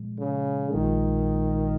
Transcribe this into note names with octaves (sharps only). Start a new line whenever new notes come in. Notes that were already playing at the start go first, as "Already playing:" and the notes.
Already playing: A#2 F3 G#3
C#3
A#1 A#2 D#3 G#3